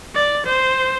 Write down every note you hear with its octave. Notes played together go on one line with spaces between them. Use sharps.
D5
C5